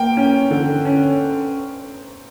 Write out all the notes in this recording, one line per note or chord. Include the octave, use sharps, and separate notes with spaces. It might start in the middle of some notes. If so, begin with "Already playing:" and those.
Already playing: A#3 G5
C#4
D3
C#4